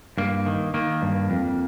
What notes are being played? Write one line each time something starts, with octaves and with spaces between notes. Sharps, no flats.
G2 A#3
D#3
D#3 A#3
G2
F2